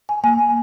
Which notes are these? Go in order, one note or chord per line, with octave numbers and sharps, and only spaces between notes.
G#5
A#3 G#5